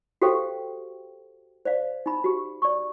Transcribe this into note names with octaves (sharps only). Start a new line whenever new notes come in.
F#4 G4 A4 C5 F5 G5
C5 D5 F5
D#4 B5
F#4 G4
D5 C#6